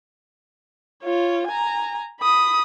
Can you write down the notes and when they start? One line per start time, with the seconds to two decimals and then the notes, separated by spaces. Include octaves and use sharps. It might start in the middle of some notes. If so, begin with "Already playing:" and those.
1.03 F4 C#5
1.47 G#5 A#5
2.20 B5 D#6